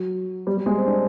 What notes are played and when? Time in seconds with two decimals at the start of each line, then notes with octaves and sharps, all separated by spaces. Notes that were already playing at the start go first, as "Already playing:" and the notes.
Already playing: F#3
0.47 G3
0.57 G3
0.66 G#3
0.77 C4
0.87 D4